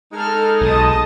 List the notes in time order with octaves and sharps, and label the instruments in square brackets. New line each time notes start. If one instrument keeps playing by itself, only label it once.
[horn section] G#3 D#4 [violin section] A4 F6
[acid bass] B1 [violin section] D#5 A5 D#6